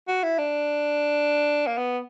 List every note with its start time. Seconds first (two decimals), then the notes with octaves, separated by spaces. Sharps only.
0.08 F#4
0.23 E4
0.38 D4
1.67 A#3
1.78 B3